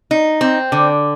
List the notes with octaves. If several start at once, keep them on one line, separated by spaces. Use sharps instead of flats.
D#4
C4
D3